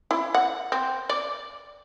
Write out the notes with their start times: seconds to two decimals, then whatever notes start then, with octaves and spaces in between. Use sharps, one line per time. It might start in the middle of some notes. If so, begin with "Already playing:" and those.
0.11 E4
0.34 F#5
0.72 C4
1.09 D5